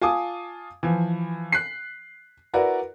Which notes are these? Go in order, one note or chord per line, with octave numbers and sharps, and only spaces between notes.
F4 G#5 A5 D6 D#6
E3 F3
F#6 B6 C7
E4 F#4 A#4 B4 D5